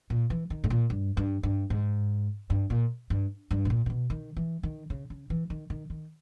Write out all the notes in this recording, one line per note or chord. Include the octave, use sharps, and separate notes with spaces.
A#2
E3
D#3
G#2
A#2
G2
G2
G2
G#2
G2
A#2
G2
G2
B2
A#2
A#2
B2
D#3
E3
D#3
C#3
C#3
E3
D#3
D#3
D#3